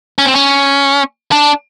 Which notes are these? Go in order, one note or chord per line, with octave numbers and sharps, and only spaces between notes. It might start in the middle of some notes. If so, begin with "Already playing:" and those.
C#4
C4
C#4
D4